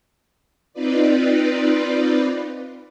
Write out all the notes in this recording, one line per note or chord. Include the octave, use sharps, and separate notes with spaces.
C4 D#4 F4 B4 D5